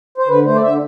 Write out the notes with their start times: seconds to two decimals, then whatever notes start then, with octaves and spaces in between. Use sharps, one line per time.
0.18 C5
0.28 D3 B4
0.45 A3 C5
0.55 D5
0.61 D3 E5